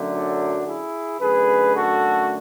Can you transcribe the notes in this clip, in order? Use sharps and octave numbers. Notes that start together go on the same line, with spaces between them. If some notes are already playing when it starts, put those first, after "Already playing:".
Already playing: F#2 D3 F#3 A3
D4 F#4
E4 G#4
F#2 D3 A3 G#4 B4
F#4 A4